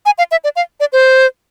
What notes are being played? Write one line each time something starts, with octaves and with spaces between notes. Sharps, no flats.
G#5
F5
E5
D5
F5
D5
C5